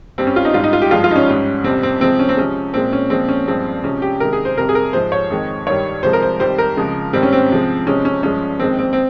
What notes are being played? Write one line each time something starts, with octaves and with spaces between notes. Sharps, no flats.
G2 G3 C4
C#4
F4
D#4
G#2 G3 F4
D#4
F4
G4
G2 F3 G#3 F4
F4
D#4
C#4
G#2 G3
F2 C3 G3 C4
C4
C3 F3 G#3 C4
C#4
C4
C3 F3 G#3 C#4
A#2 G#3 C4
C#4
A#2 F3 G#3 C4
C#4
G2 F3 G#3 C4
C3 F3 G#3 C#4
G4
C3 D#3 G#3 A#4
G#4
C5
F2 C3 G3 A#4
G#4
A#4
G#2 F3 G#3 C5
C#5
F2 D#3 G#3
G2 D#3 G3 C#5
C3 F3 G#3 C5
A#4
C5
F2 D#3 G3 C5
A#4
F2 C#3 F3 G#3
G#2 D#3 G3 C4
C#4
C4
C3 F3 G#3
C3 F3 G#3 C#4
C#4
G2 F3 G#3 C#4
F2 D#3 G#3 C4
C4
C4